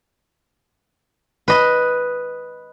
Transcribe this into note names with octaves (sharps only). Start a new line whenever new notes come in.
B4 D#5